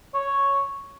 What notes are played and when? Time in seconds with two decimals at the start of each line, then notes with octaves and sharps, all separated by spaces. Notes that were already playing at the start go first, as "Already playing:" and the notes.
0.14 C#5